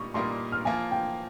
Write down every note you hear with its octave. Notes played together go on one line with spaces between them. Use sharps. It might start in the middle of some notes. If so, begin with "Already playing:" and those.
Already playing: A#2 G3 A#3 D#4 C#6
A#2 G3 A#3 D#4 A#4 C6
F6
F3 A#3 F4 G#5
G5